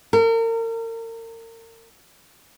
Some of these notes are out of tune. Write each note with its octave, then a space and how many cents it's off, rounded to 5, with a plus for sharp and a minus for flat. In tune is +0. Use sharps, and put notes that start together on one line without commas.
A#4 -35